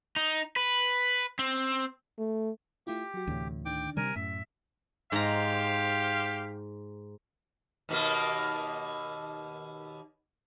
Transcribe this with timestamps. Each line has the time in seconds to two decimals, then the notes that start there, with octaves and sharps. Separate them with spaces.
0.16 D#4
0.56 B4
1.39 C4
2.18 A3
2.87 A3 E4 F4 G4
3.14 F#3 F#4
3.27 D2 A2 C3 E3
3.66 D3 D#3 D4 G5 D6
3.97 C3 G3 A#4 G#5
4.16 F#2 A2 E5
5.12 G#2 G4 C5 F5 A#5
7.89 D#2 B2 A#3